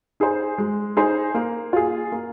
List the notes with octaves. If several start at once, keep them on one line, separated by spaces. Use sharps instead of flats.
D#4 G#4 C5
G#3
D#4 G#4 C5
A#3
F4 G#4
A#3